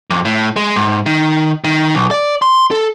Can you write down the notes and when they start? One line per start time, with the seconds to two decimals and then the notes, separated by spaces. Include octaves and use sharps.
0.10 F2
0.25 A2
0.56 G#3
0.76 G#2
1.06 D#3
1.64 D#3
1.95 B1
2.11 D5
2.42 C6
2.71 A4